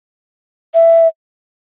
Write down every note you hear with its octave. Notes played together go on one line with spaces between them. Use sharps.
E5